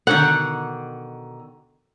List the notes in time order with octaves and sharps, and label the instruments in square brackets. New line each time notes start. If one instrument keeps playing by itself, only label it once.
[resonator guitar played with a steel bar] B2 D3 D#3 [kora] F#5